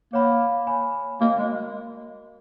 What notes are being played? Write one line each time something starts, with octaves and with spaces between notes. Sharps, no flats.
A#3 C#5 F#5 B5
C#5 G#5 B5
A#3 F#4 A#4 D#5
G#3